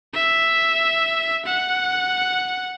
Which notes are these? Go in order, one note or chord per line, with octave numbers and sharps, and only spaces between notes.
E5
F#5